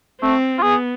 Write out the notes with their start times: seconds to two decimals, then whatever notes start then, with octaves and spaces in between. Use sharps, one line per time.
0.21 A3 C4
0.58 F4
0.63 B3 G#4